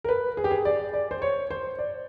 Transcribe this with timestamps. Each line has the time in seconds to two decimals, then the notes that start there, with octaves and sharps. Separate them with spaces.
0.04 A#4
0.09 B4
0.37 G#4
0.44 G4
0.51 G#4
0.65 D5
0.93 D5
1.11 C5
1.22 C#5
1.51 C5
1.79 D5